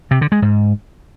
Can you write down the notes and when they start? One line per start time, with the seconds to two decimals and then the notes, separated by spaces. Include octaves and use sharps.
0.11 C3
0.21 D3
0.32 G#3
0.42 G#2